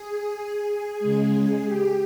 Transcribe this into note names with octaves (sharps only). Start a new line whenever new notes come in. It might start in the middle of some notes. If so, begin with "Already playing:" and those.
Already playing: G#4
G#4
C#3 G#3
G#4
G4